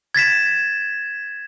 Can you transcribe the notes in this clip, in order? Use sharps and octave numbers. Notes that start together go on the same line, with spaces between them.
G#6 A6 B6 E7